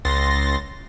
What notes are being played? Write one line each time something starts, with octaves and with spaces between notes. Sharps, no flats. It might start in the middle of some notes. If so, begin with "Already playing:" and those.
C#2 C6 A6 A#6